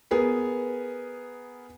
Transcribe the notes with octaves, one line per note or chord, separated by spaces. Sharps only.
B3 G#4 A#4